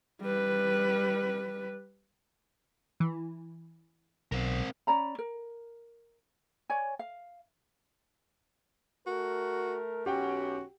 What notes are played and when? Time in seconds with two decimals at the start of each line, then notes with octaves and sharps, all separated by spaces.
0.21 G3 B4
3.00 E3
4.32 B1 C4 A#4
4.87 C#4 D5 A#5 B5
5.19 A#4
6.70 C#5 D5 G#5
6.99 F5
9.07 A3 F#4 A#4
10.06 B1 C#4 F#4 G4 F#5 G5